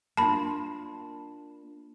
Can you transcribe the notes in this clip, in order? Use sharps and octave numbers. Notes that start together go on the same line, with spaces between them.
A#3 D4 F4 A5 B5